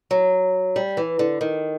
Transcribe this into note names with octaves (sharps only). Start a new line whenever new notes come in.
F#3
G3
E3
D3
D#3